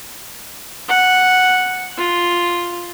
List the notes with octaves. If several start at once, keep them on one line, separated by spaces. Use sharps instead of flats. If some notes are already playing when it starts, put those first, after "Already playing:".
F#5
F4